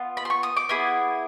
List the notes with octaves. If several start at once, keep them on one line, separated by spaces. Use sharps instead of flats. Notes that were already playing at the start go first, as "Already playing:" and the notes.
Already playing: B3 F4
B5
C6
C#6
D#6
D6
B3 E4 G#4